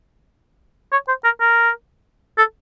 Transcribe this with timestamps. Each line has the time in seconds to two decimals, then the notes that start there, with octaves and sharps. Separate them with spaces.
0.92 C#5
1.08 C5
1.24 A#4
1.41 A#4
2.38 A4